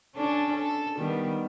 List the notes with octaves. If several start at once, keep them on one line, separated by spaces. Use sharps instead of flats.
C#4 D4 A4
A4
D#3 G3 B3